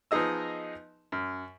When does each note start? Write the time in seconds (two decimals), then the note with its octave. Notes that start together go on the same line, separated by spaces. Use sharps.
0.11 F3 B3 D#4 G#4 D#5 E6
1.12 F#2